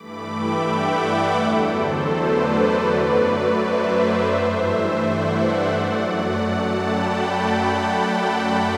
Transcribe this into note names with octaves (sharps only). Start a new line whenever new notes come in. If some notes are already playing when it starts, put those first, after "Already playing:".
Already playing: G2 E3 A3 B5 D6
E5 G5
D5 F#5
E2 D3 F#3 A3 A4
A4 C5
B4 D5
F#2 F#3 A3
C5 E5
G2 E3 A3
D5 F#5
F#2 F#3 A3
F#5 A5
G5 B5